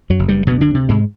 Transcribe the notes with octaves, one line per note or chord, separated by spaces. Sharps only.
F#2 F#3
F#1
G2 G3
D2 B2 B3
D3 D4
C3
G#2 G#3